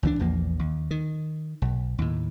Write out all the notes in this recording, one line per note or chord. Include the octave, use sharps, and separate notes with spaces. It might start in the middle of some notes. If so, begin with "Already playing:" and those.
C#2 E3 A3 D4
A#1 E2 F3 A#3
D#2
D#3
B1
D#2 A2